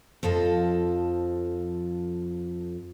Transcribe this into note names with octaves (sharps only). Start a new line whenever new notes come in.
F2 F3 A4 D#5